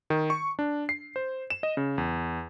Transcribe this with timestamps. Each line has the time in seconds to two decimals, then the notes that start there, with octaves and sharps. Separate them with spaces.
0.10 D#3
0.30 C#6
0.59 D4
0.89 C7
1.16 C5
1.50 E7
1.63 D#5
1.77 C#3
1.98 E2